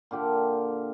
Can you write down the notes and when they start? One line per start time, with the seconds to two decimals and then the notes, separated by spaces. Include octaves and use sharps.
0.11 A#2 D3 G4